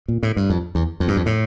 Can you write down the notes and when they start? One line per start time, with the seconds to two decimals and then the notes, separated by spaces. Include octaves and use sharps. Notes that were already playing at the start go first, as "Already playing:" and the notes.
0.08 A#2
0.23 A2
0.37 G2
0.50 F2
0.75 E2
1.00 F2
1.08 G2
1.17 F2
1.26 A2